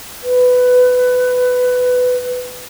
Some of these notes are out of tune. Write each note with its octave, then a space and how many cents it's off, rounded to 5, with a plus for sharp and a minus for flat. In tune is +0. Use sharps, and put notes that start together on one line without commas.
B4 +15